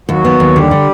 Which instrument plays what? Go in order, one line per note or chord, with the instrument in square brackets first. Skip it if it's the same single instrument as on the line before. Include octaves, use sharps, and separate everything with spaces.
[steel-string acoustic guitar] D#2 [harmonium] F#3 F#4
[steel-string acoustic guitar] B3
D#2
[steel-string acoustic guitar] D3 [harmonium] G3 G4
[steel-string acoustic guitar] D3